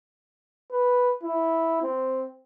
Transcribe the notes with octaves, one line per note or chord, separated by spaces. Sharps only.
B4
E4
C4